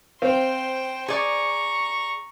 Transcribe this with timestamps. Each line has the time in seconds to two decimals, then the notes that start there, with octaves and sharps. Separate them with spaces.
0.22 C4 C5 F5 G5
1.08 G#4 D5 A#5 C#6